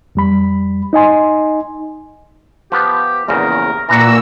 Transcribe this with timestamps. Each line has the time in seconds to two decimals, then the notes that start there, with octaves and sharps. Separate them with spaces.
0.15 F2 G3 B5
0.93 D#4 D#5 G#5 C6
2.72 F3 B3 G4
3.28 A#1 E2 C#3 A#4
3.89 A#2 E3 D4 F#4 A#5 E6